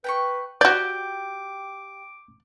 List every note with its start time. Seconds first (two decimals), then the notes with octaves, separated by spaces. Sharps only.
0.04 B4 G5 A#5 C#6
0.61 F#4 G4 D5 F5 D6 G6